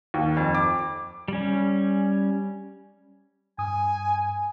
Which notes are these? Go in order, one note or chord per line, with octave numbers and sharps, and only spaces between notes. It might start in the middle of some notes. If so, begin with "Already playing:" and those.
D#2
F2
D6
G3 C#4
G2 G#5 D#6